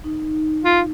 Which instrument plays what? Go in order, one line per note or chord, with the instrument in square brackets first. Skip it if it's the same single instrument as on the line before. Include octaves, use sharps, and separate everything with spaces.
[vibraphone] D#4
[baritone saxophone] F4